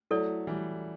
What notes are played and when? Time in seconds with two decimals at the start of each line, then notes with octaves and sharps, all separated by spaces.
0.11 F#3 A3 E4 A4 D5
0.47 E3 G3